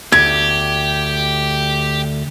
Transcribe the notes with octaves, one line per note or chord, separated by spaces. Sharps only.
D2 G4 G#6